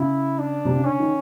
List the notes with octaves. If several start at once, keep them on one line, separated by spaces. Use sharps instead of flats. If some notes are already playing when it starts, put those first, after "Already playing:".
Already playing: C#3 E4
D4
C3
C#3
D3 C#4
D#3